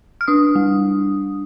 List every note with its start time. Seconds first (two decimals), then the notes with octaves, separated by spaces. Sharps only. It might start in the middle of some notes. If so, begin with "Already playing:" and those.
0.21 F6
0.28 D4 D#6
0.55 G3